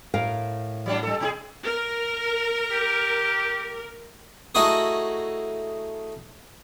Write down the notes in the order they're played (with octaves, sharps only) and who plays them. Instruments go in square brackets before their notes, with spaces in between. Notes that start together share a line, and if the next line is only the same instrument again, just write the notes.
[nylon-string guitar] A2 A#4 F5
[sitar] F#3 G3 D4
G3 A4
B2 D#4 G#4
[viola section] A#4
[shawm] G4
[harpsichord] A3 D#4 E4 F#4 G#4